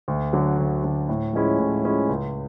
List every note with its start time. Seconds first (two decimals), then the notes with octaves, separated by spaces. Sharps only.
0.08 D2
0.33 D3 F#3
0.58 D2
0.83 D3 F#3
1.09 A2
1.33 F3 G#3 C#4 E4
1.58 A2
1.84 F3 G#3 C#4 E4
2.09 C#2